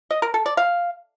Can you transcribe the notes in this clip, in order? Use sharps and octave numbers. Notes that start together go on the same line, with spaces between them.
D#5
A#4
A4
D5
F5